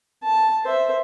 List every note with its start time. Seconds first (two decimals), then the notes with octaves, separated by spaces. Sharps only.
0.24 A5
0.64 C5 E5